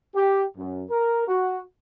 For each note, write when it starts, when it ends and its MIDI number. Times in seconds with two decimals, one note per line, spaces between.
0.15 0.44 67
0.57 0.84 42
0.90 1.26 70
1.28 1.61 66